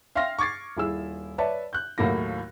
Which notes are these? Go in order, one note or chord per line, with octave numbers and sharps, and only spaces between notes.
E5 F5 G5 C6 F6 A#6
C#6 D6 G#6 A6 C7
D#1 E4 G#4 E6
B4 C#5 D5 E5 A5
F#6 G6
D#2 A2 F#3 A#3 E4 A#6